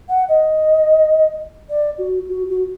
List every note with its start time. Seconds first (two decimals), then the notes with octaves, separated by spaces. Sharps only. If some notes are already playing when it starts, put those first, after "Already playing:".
0.09 F#5
0.29 D#5
1.69 D5
1.98 F#4
2.29 F#4
2.49 F#4